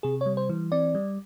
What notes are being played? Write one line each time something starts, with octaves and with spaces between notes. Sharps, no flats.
C3 G#4
G3 C#5
C5
E3
C4 D5
G3